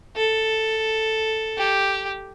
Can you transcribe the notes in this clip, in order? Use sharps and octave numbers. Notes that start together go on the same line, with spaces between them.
A4
G4